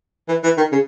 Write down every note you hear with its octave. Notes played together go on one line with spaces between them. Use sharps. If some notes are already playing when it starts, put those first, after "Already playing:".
E3
E3
D#3
C#3